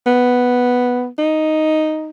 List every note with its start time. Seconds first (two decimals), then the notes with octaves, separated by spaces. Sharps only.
0.06 B3
1.19 D#4